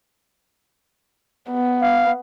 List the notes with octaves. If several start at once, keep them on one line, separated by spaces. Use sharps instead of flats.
B3
F5